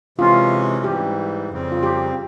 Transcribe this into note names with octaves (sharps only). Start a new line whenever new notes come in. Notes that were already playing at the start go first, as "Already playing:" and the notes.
C3 E3 G#3 C#4 F4
G#2 E3 G3 G4
F2 C#3 G3 C4
F4
G4